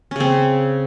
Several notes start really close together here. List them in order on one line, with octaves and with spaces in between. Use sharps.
C#4 C#3 C4